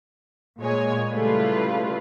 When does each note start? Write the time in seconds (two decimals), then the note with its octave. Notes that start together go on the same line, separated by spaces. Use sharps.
0.59 A#2 G#3 C#5 G#5
1.11 C#3 G3 A3 E4 F4 B4